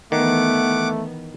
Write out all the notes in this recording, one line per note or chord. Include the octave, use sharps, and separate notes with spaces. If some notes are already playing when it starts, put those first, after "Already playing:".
D#3 E3 A3 B3 F#5 D6